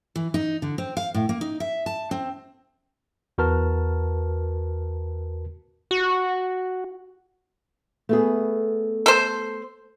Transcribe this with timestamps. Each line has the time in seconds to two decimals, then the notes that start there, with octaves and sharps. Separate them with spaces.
0.16 E3
0.34 D#4
0.62 D3
0.78 C4
0.97 F5
1.14 A2
1.29 A#3
1.41 D#4
1.60 E5
1.86 A5
2.11 C4
3.38 E2 F#4 A#4 B4 A5 F6
5.91 F#4
8.09 A3 B3 G#4
9.06 A4 C5